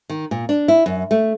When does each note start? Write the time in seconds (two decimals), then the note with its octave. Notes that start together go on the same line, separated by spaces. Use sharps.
0.10 D#3
0.31 A#2
0.49 D4
0.68 E4
0.86 F#2
1.11 A3